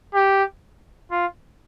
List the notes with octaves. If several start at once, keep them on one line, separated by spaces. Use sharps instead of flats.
G4
F4